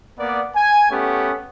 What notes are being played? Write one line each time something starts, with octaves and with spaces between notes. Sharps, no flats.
A#3 B3 D5
G#5
A3 B3 C#4 G4